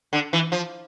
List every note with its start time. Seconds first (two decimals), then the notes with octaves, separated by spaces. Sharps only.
0.13 D3
0.33 E3
0.52 F3